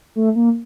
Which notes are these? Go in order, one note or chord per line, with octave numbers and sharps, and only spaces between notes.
A3
A#3